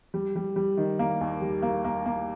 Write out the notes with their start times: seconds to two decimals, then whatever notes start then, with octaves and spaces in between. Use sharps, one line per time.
0.14 G3
0.36 G3
0.56 G3
0.77 D#3
0.99 A#3
1.21 D#2
1.41 G3
1.62 A#3
1.84 A#3
2.06 A#3